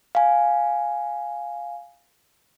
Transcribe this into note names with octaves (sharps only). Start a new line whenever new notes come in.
F5 G#5